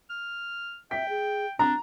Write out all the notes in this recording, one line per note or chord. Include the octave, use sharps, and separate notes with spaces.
F6
E5 G5 B6
G#4
C4 D4 A#5